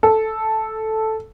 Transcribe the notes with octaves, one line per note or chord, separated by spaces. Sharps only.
A4